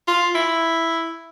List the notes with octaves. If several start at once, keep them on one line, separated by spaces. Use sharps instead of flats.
F4
E4